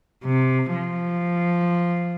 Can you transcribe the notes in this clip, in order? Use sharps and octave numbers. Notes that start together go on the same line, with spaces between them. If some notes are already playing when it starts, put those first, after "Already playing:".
C3
F3